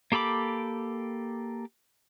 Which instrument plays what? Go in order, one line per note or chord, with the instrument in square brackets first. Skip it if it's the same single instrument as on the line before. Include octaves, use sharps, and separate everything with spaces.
[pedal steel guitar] A#3 G4 A4 B5 D6